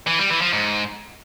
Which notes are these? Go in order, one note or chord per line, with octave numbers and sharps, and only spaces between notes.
E3
G3
E3
F3
G#2